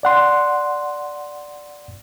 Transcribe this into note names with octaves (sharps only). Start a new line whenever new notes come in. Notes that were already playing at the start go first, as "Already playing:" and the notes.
D5 F#5 C6